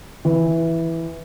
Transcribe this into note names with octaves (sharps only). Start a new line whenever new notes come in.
E3